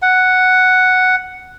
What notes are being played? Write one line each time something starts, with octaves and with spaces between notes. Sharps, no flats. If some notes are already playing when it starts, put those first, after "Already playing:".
F#5